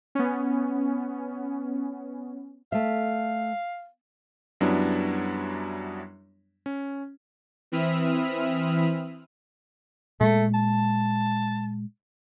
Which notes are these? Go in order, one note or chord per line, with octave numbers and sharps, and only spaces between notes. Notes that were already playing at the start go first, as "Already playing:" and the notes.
B3 C#4
A3 E5 F5
F#2 F#3 G3 B3 D4 E4
C#4
E3 C4 E5 B5 D#6 F6
A#2 G#3 A3
A5